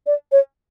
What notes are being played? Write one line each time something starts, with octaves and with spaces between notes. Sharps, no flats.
D5
C#5